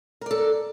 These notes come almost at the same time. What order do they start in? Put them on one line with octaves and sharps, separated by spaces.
A#4 D5 A4